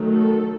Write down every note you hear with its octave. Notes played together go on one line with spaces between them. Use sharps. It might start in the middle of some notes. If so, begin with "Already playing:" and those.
Already playing: D#3 F#3 A3
A4